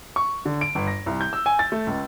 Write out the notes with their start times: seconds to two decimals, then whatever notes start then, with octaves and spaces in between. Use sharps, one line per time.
0.16 C#6
0.45 D3
0.61 D7
0.75 G1
0.87 A#6
1.06 C2
1.21 G6
1.33 E6
1.46 G#5
1.59 A6
1.72 A3
1.87 C#2